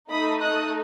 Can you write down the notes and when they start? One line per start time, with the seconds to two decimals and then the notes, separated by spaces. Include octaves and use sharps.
0.11 A3 D#4 A4 B5 D#6
0.42 D#6 F#6